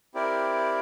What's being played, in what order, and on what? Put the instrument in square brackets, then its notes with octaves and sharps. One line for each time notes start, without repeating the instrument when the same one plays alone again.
[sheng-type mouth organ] C4 E4 G4 A#4 D5